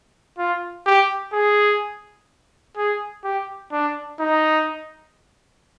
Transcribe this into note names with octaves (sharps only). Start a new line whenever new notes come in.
F4
G4
G#4
G#4
G4
D4
D#4